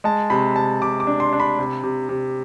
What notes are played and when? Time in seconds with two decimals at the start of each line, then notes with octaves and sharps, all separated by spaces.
0.04 G#3 A5
0.30 C3 B5
0.56 C3 A5
0.81 C3 D6
1.00 D6
1.07 D4
1.20 C6
1.33 D4
1.40 B5
1.59 C3
1.83 C3
2.09 C3